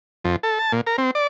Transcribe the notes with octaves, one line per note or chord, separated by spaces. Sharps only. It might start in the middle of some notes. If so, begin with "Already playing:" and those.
F2
A4
A5
A#2
A#4
C4
D5